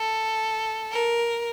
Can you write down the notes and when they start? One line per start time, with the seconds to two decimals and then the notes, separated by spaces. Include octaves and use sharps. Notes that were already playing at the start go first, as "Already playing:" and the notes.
Already playing: A4
0.93 A#4